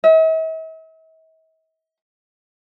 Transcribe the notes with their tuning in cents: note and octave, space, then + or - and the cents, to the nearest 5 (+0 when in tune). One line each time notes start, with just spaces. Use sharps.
E5 -45